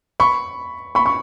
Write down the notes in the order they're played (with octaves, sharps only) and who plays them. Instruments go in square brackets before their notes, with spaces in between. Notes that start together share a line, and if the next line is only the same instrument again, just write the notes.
[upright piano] B5 C#6
B5 C#6
C#6